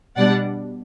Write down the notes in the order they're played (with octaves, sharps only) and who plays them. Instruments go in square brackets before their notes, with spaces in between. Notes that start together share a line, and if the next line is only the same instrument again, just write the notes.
[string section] B2 G3 D4 D5 F#5